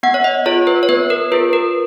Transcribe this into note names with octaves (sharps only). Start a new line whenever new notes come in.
B3 F#5
C#5
D#5
F4 G#4 C#5
B4
C#5
B3 B4
A#4
F4 G#4 B4
A#4